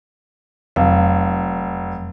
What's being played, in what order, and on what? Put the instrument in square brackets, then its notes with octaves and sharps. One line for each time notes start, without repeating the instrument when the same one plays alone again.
[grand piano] F1 [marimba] F2 F#3 F5